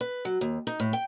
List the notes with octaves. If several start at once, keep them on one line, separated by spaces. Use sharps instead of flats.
B4
F#3
D#2
D#4
A2
G5